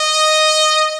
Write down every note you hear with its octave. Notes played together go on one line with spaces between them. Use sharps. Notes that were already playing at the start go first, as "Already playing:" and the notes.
Already playing: D#5